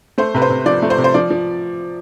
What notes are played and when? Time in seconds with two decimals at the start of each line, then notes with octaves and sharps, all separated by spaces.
0.18 A3 C5
0.35 C3 B4
0.42 C5
0.50 C3
0.66 F3 D5
0.82 A3
0.90 C5
0.98 C3
1.04 C5
1.14 F3 D5
1.30 F3